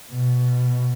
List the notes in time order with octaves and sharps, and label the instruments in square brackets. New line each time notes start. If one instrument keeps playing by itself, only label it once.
[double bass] B2